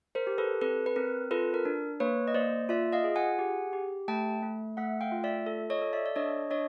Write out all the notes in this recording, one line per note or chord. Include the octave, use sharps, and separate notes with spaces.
A#4 C5
G4
A4 B4
C4 A4 B4
B4
C4 A#4
F4 A4 B4
A#4
D4
A#3 B4 C#5
D#5
A#3 C5 D5
F4 D5 E5
D#5 F5
G#4
F#5 G#5
G4
G4
A3 G5 A5
A3
A3 E5 F#5
F5 G5
F4
D5 E5
A4
C#5 D#5
A4
D5 E5
D5
D4 C#5 D#5
D4 C#5 D#5